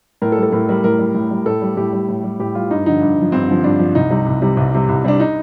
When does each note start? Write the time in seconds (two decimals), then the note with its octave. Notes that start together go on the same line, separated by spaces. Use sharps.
0.22 A2 A#4
0.32 A4
0.37 G3
0.43 A4
0.52 A2 A#4
0.69 G3 A#4
0.84 A2 A#4
0.99 G3
1.15 A2
1.31 G3
1.46 A2 A4
1.62 G3
1.77 A2 G4
1.93 G3
2.08 A2
2.24 G3
2.39 A2 G4
2.55 G3 F4
2.71 G2 D#4
2.86 D3 F3 D#4
3.02 G2
3.17 D3 F3
3.32 G2 C4
3.48 D3 F3
3.64 G2 D4
3.79 D3 F3
3.95 C2 D#4
4.10 C3 G3
4.26 C2
4.42 C3 G3
4.57 C2
4.73 C3 G3
4.88 C2
5.04 C3 G3 D4
5.20 D#4